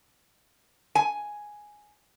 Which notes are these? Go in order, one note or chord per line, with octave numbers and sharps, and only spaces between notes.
G#5